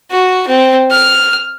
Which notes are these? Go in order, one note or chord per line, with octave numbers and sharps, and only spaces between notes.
F#4
C4
F6